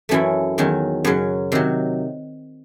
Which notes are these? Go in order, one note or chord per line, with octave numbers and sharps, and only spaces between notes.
F#2 E3 A3 C#4 E4
E2 D#3 F#3 C#4
F#2 C#3 F#3
C3 D#3 F#3